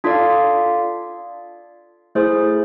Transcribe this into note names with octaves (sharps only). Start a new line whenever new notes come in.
D4 F4 A4 D5 F5
A3 E4 G#4 C5